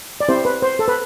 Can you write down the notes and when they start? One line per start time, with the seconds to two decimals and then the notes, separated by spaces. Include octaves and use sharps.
0.21 D5
0.29 C4 E4 G4 C5
0.45 B4
0.62 C5
0.79 A4
0.88 B4